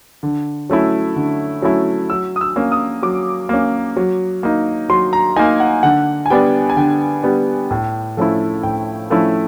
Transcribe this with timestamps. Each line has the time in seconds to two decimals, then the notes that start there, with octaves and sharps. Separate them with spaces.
0.23 D3
0.70 F#3 A3 C#4 E4
1.16 D3
1.62 F#3 A3 C#4 E4
2.10 F#3 E6
2.36 D#6
2.41 E6
2.56 A#3 C#4
2.72 D#6
3.03 F#3 D6
3.49 A#3 C#4
3.97 F#3
4.43 A#3 D#4
4.90 F#3 C6
5.13 A#5
5.36 A#3 D#4 G#5
5.60 F#5
5.83 D3 F#5
6.26 G#5
6.30 G3 B3 D4 G5
6.70 G#5
6.77 D3 G5
7.23 G3 B3 D4
7.71 A2
8.17 F3 A3 C#4 E4
8.63 A2 G5
9.10 F3 A3 C#4 E4